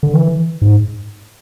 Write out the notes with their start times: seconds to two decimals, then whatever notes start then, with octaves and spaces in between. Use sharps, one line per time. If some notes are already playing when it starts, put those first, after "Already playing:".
0.03 D3
0.14 E3
0.62 G#2